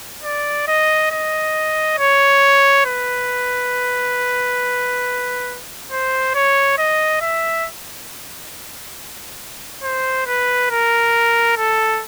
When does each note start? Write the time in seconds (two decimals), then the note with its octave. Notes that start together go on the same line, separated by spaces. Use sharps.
0.24 D5
0.68 D#5
1.11 D#5
1.98 C#5
2.86 B4
5.92 C5
6.34 C#5
6.78 D#5
7.21 E5
9.83 C5
10.27 B4
10.71 A#4
11.57 A4